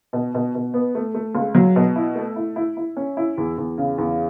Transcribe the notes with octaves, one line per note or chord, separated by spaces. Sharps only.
B2
B2
B2
B3
A3
A3
C#2
F#3
B2
E4
A3
E4
E4
E4
C#4
E4
E2
E2
C#3
E2